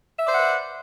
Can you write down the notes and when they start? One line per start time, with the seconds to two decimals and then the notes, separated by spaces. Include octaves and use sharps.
0.19 E5
0.24 D5
0.29 C5
0.33 F#5
0.38 B4